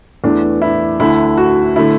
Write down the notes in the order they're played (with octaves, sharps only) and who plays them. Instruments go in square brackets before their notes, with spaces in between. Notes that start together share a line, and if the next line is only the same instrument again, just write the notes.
[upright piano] E2 E3 A3 D4
E4
D2 D3 A3 E4
F#4
D3 A3 E4